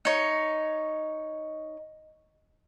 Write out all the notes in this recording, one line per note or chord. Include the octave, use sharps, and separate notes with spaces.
D#4 C#5